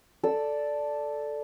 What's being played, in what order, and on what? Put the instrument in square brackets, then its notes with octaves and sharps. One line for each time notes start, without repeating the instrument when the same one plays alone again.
[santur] A4 D5 E6